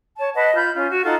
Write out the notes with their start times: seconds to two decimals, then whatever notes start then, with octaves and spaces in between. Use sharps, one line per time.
0.18 C#5 A5
0.35 B4 D#5 F#5 A5
0.55 F4 B5 G6
0.75 C#4 F4
0.89 F#4
1.04 D#4 F4 A4 F#5